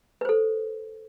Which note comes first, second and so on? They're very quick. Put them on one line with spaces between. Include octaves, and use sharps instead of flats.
B4 C5 A4